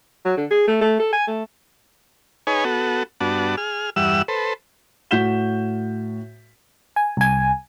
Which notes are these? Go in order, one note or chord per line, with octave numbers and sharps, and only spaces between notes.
F#3
D3
G#4
A3
A3
A4
G#5
A3
D#4 G#4 B4 C#5 G#5
B3 F#4 A4
G2 B3 D4 F#4 A5
G#4 F6
E2 G2 G3 E5 F#5 E6
A4 B4 C5
A2 F#4 G6 B6 E7 G7
G#5
C2 G#5